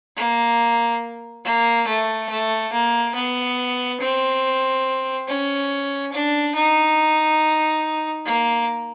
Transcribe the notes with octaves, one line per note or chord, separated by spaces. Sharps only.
A#3
A#3
A3
A3
A#3
B3
C4
C#4
D4
D#4
A#3